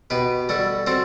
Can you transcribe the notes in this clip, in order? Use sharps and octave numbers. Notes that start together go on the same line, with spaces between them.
B2 G4 B4
G3 F#4 A4
C4 F#4 A4